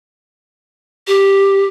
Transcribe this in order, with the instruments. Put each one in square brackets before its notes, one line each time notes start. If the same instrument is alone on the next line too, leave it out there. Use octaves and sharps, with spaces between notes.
[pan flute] G4